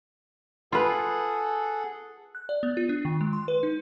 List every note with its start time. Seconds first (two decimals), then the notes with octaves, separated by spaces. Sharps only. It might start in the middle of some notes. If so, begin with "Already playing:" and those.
0.72 F4 G#4 A4 B4 F#5
2.35 F#6
2.49 D5
2.63 B3
2.77 F4
2.89 D4
3.05 D#3
3.21 G#3
3.33 C6
3.48 B4
3.63 D#4